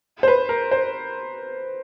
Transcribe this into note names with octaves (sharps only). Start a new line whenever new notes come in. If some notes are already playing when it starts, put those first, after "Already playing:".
C5
B4
A#4
C5